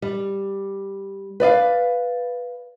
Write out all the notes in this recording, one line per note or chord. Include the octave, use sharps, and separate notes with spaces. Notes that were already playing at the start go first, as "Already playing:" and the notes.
G3
B4 D5 D#5 F5